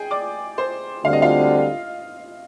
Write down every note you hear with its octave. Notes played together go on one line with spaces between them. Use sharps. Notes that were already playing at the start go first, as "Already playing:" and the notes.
Already playing: G#4 G5 G#5
D5 D6
C5 C6
D2 D3 G3 C4 F5
D#5
F4 F5